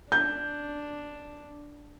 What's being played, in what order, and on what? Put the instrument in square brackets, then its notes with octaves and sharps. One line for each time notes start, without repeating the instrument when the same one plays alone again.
[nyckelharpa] D4 [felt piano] G6